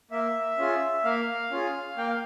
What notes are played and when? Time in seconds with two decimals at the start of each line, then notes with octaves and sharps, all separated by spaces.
0.11 A#3 E5
0.58 C#4 F4 G#4
1.04 A#3 F5
1.51 C#4 F4 G#4
1.97 A#3 G5
2.08 F5